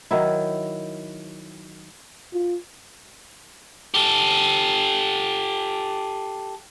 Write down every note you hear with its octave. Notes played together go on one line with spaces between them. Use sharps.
D#3 F#3 E4
F4
G4 A4